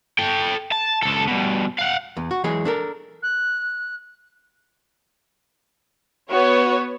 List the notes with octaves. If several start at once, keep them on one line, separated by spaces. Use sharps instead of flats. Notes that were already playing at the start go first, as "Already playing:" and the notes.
A4 G5
A5
C#2 A4
G2 B2
F5 F#5
E2
F#4
E3 F#3 G#3 G#4
D4 A4 A#4
F#6
B3 F#4 C#5